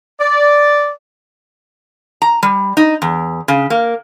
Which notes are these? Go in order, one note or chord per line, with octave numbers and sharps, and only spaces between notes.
D5
A#5
G3
D#4
E2
C#3
A#3